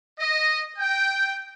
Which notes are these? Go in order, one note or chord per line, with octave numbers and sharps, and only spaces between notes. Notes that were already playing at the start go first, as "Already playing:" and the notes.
D#5
G5